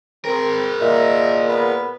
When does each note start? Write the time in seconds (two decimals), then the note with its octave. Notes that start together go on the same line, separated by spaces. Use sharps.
0.25 C4 G#4 A#4
0.81 A#2 D#5 E5
1.49 B3 B4